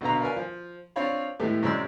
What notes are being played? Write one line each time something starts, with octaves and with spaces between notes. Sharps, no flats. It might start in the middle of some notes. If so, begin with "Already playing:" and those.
B1 B2 D3 B3 F5 A#5
A#4 B4 D5 F5 G#5
F3
C4 D4 F4 C#5 F5 B5
A2 E3 G#3 A3 B3 G4
F#2 C3 G#3 D5 B5 E6